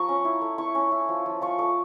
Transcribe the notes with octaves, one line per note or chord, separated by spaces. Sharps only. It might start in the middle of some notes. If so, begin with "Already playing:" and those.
Already playing: F3 A#5 C#6
C#4
E4
A3
E4 C#6
C#4
E4
F3
F3
F3 C#6
A3 D6